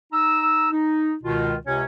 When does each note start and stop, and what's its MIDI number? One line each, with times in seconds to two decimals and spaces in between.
0.12 0.69 63
0.12 0.69 82
0.12 0.69 88
0.71 1.14 63
1.23 1.55 37
1.23 1.55 47
1.23 1.55 51
1.23 1.55 65
1.66 1.84 37
1.66 1.84 48
1.66 1.84 61
1.66 1.84 73